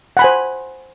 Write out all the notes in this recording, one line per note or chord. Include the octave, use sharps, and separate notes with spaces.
C5 F#5 G#5 B5